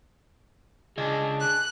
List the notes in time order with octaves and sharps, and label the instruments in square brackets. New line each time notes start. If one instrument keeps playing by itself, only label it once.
[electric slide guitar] C#3 D#5 G#5 [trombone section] D4 G#4
[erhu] F#6